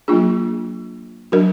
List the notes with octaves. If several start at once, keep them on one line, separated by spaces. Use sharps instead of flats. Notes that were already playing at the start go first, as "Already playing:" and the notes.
F#3 A#3 D4 F4 G#4
F#3 D4 F#4 A#4